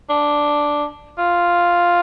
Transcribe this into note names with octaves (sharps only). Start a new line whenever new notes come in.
D4
F4